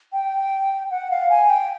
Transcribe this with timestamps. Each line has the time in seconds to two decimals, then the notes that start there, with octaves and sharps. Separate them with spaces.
0.13 G5
0.91 F#5
1.11 F5
1.30 G#5
1.50 G5